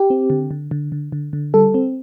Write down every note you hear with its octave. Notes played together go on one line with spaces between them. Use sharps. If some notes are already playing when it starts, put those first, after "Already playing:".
Already playing: G4
C4
D3
D3
D3
D3
D3
D3
G3 A4
C4